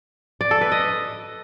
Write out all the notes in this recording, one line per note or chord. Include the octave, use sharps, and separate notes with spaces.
D5
A4
B4
D#5